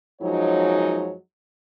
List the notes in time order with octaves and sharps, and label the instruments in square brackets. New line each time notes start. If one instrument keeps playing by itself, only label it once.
[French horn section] F#2 F3 F#3 G#3 D#4 C#5